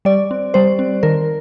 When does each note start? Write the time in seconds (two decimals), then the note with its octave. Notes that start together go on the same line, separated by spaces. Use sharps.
0.05 G3 D5
0.31 C4
0.54 G3 C5
0.79 C4
1.03 D#3 A#4